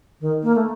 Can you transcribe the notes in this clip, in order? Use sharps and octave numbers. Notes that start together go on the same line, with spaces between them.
D#3
A#3
A3